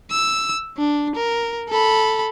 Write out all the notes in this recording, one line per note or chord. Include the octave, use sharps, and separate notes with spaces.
E6
D4
A#4
A4 B5